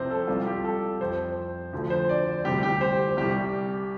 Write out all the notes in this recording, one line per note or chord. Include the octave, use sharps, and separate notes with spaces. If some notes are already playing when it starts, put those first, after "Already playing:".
Already playing: C2 C3 F3 C5
A4
C2 C3 G3 F4
G4
A4
F2 F3 C5
D2 D3 F3
C5
D5
D2 C3 G3 G4
G4
C5
C2 C3 G3 G4